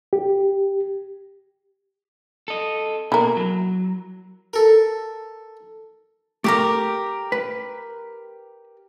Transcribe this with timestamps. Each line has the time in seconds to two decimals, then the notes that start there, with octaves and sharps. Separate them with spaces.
0.13 G4
2.48 A4 D#5
3.12 B2 A#3 E4 A#4
3.37 F#3
4.53 A4 A#4
6.44 A3 G4 G#4 A#4 G5 A#5
7.32 B4